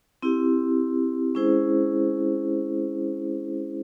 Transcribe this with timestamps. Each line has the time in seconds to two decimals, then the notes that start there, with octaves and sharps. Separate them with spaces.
0.23 C4 E4 G4
1.35 G#3 C#4 E4 G#4 C5